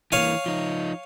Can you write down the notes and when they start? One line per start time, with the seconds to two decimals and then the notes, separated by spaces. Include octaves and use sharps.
0.12 E3 A#3 C#5 F5 G#5
0.46 F3 D#4